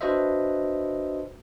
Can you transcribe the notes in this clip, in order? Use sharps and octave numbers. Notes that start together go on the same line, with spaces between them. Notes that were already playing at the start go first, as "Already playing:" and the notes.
D4 F#4 B4 C5 D#5 E5